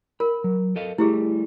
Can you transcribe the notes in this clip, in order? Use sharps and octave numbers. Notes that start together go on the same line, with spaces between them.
A#4 B5
F#3
A4 D#5 F5
G3 A3 E4 G4 G#4